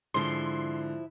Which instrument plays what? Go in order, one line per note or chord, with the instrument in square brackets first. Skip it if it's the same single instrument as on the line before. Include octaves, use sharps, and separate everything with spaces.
[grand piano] G#2 D3 [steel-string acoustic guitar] F3 E4 [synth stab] C6